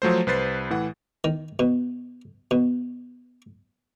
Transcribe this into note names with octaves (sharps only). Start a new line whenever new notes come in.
F3 F#3 A3 C5
C2 B4 C5 A6 C7
A2 E3 F#5
D#3
B2
B2